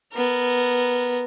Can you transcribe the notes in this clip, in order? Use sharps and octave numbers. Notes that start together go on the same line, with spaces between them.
B3 A#4